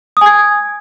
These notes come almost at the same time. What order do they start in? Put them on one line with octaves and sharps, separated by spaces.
D#6 G#5 G#6